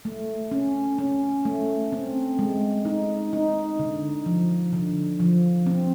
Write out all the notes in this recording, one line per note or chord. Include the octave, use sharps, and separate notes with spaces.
A3
C#4
C#4
A3
C4
G#3
D#4
D#4
D3
F3
D3
F3
C4